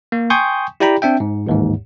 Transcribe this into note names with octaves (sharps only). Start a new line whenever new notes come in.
A#3
G5 G#5 C6 C#6 D#6 G6
E4 G4 D5 G5 A#5 B5
C4 D4 E5 G5
G#2
A1 D#2 G#2